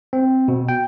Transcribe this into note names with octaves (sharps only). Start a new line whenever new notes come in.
C4
B2
G5